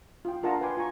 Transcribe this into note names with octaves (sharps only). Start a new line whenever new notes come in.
F4 G5
D4 F4 A#4 F#5 A5 A#5
B4 G5 G#5 C6 D6
F4 G#5 A#5 C#6